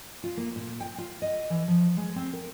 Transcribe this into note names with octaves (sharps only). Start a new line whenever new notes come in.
F4
A#3
A#2
G5
F4
D#5
E3
F3
G#3
C4
A#4